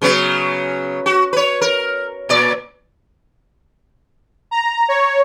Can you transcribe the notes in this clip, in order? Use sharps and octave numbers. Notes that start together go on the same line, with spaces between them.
C#3 F#3 B3
F#4
B4 C#5
A#4
A#2 D5
A#5
C#5